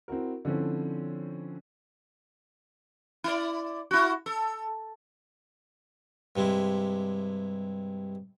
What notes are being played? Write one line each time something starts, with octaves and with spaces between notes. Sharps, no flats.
C4 E4 F#4 A#4
D3 F3 C4 C#4 E4
E4 D5
E4 F#4
A4
G2 C3 G#3 E4